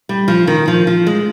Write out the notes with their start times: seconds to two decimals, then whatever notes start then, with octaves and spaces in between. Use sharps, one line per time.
0.09 G3
0.28 F3
0.47 D#3
0.68 F3
0.87 F3
1.07 G#3